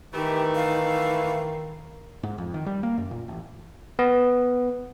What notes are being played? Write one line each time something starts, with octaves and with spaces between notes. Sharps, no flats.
D#3 E3 A3 D#4 G4
F5
G#2
F2
D#3
G3
A#3
F#2
A#2
A1
B3